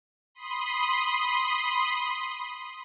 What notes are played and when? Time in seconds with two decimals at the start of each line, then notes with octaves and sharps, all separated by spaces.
0.35 B5 C6 D#6